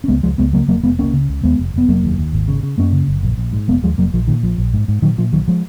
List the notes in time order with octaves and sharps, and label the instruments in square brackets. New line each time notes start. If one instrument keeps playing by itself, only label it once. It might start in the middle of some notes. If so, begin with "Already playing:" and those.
[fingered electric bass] C#4
C#2 G#3 B3
C#2 F3 G#3
C#2 G#3 B3
C#3 F#3 A#3
F1 F#3 A#3
F1 G#3 B3
C#2 A#3 C#4
C#3
C#2
D#2 G#3 B3
F1
F1 B3
F1 F#3 A#3
D#2
D#2
G#1
C#3
C#3
F#2 A#3 C#4
C#3
F#1
A#1
A#1
G#2
F1 G#3 B3
D#2 F3 G#3
F1 F#3 A#3
A#1 F3
A#2 D#3
A#1 F3
A#1
G#2
G#2
A#2 D#3 F#3
A#2 F3
B1 D#3 F#3
F3 G#3